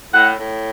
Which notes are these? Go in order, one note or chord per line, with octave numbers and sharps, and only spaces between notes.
A2 F#5
A2